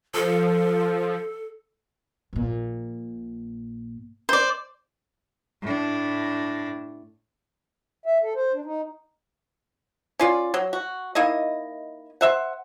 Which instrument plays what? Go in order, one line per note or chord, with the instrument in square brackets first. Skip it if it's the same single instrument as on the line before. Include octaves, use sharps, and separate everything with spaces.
[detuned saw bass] F3 [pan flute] A4
[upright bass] A#1 A#2
[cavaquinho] C5 D5
[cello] A2 D4
[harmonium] E5
A4
C5
D4
D#4
[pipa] C#4 F4 D5
F#3
F#4
A#3 D#4 E4 D#5
C5 E5 F#5